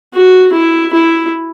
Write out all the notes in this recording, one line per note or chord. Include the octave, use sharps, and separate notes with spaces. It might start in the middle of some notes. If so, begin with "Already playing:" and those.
F#4
E4
E4